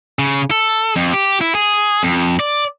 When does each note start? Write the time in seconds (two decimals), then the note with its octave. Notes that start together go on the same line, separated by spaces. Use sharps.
0.19 C#3
0.51 A4
0.96 F2
1.13 G4
1.41 E4
1.55 G#4
2.03 F2
2.39 D5